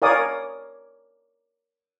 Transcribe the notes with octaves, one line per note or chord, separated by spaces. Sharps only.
A#4 C#5 D5 F5 G#5 D#6